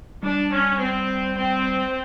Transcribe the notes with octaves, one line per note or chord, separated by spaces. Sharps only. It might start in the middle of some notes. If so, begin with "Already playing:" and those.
G3 D4
C#4
C4
C4